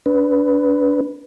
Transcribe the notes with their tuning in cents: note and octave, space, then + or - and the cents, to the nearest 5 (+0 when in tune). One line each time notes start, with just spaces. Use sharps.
D4 -30 B4 +0